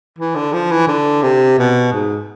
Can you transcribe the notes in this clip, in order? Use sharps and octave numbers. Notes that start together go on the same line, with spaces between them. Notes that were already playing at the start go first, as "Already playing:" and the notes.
E3
D3
F3
E3
D3
C3
B2
G#2